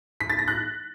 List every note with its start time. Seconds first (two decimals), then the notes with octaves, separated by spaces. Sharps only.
0.20 B6
0.30 A6
0.39 A#6
0.48 F#6